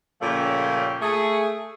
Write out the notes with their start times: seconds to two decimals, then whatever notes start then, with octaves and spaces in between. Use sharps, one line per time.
0.22 A#2 C#3 F3 A3 C#4 G4
1.02 A3 G#4